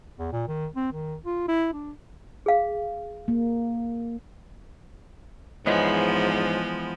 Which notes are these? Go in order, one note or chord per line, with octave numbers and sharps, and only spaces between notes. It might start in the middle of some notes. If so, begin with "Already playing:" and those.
E2
A#2
D#3
C4
D#3
F4
E4
D4
G#4 F5
A#3
G#2 E3 F3 G#3 B3 B4 C#5 D#5